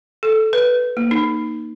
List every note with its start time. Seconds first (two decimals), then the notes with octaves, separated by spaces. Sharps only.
0.23 A4
0.53 B4
0.97 A#3
1.11 D#4